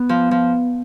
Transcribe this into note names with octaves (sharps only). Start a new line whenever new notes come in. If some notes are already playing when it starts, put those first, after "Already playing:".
Already playing: B3
F3
F3